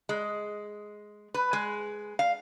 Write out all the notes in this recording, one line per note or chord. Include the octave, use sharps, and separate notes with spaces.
G#3
B4
G#3
F5